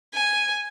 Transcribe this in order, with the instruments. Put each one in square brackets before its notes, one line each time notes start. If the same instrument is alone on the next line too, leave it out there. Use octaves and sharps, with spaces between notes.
[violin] G#5